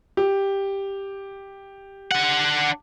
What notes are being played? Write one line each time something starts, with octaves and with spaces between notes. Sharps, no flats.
G4
D4 F#5